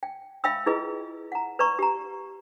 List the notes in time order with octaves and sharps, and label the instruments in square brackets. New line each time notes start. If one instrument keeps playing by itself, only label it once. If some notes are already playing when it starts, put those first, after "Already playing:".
[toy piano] G5
E5 F5 G5 B5 E6
E4 F4 G#4 B4 D#5
F#5 A#5
B4 D5 A#5 C#6
G4 A#5